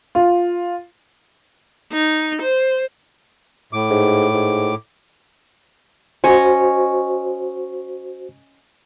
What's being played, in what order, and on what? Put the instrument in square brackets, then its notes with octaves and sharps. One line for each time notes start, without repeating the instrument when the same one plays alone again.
[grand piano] F4
[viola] D#4
C5
[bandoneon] A2 D6
[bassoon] G#2
G#2
[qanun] C#4 C#5 D#5 [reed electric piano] F#4 C5